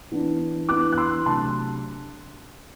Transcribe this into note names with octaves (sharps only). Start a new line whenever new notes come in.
E3 B3 D4
E3 B3 D4 D6 F#6
F#6
C6 E6
C3 F#3 A3 D4 A5 C6